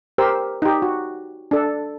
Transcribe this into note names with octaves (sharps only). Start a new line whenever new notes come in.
G4 A#4 C5 E6
D#4 G4
F#4
D4 A4